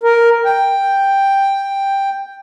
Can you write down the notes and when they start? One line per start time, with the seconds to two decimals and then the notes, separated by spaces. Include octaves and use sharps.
0.03 A#4
0.45 G5